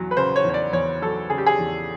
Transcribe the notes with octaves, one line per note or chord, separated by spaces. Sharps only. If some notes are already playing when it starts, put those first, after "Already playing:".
Already playing: E2 F#3
B4
C#3 C5
C#5
E2
C#5
D5
E2 C#5
F#3 A4
C#3 G#4
G4
G#4
E2